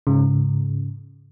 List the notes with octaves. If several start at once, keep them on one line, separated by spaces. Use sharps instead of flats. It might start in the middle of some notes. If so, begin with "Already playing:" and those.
G#2 C#3